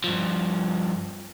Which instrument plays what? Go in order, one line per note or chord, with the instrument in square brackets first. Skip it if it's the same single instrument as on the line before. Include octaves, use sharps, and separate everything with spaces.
[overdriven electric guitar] G2 F3